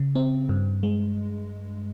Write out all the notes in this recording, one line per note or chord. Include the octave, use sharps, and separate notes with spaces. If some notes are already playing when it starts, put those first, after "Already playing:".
Already playing: C#3
C4
G2
G#3